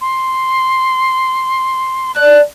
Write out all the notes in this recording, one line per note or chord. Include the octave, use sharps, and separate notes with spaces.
C6
D5 A5 F#6